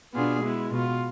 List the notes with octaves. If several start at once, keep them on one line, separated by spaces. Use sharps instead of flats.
B2 B3 D4 F4 G#4
G#3 B3 E4
B2 B3 F4